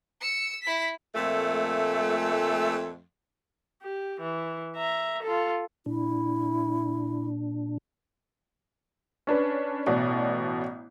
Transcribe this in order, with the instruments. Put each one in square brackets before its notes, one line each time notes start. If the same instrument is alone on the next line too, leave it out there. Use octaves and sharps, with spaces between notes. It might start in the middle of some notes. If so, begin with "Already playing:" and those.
[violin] E6 C#7
E4 B6
[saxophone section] F2 A#2 A3
[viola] G4
E3
E5 A#5
F4 A4
[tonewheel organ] A#2 D4 [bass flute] E4
[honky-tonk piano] C#4 D4 B4
A1 B2 D5